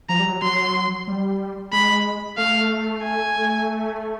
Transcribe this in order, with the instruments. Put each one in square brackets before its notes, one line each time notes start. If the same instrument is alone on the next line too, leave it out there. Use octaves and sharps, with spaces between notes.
[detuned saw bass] F3 [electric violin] A#5
[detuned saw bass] G3
F#3
[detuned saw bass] F#3 [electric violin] C6
[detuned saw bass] G3
[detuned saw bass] G#3 [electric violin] B5
[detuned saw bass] A3 [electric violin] F5
[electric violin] G#5